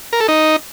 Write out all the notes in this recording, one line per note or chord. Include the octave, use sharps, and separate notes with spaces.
A#4
A4
D#4